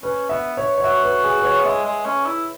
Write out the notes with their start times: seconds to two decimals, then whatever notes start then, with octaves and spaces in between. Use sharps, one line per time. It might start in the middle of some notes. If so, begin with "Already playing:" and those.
0.02 C#4 B4
0.29 B3 E5
0.57 C#5
0.78 C#5
0.84 F#4 E5
1.04 B4
1.24 G#4
1.40 B4
1.45 C#5
1.60 B3
1.65 G#3 E5
1.85 G#3
2.06 C#4
2.26 E4